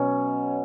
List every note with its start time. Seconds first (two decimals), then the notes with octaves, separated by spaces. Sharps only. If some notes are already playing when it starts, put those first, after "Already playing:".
Already playing: B2 F#3 C#4